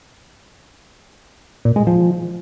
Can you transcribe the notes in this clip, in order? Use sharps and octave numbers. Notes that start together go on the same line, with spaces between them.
A#2
G#3
F3